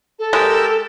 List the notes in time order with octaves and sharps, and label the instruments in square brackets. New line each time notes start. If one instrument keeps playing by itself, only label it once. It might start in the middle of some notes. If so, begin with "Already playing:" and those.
[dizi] A4
[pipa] G#3 [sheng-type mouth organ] G4 A#4 E6